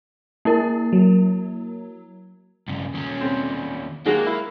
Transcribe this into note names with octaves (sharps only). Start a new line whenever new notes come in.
A#3 E4 A#4
F#3
G2 C#3
D#2 C#4
C4
D#3 G#3 A#3 F#4
E4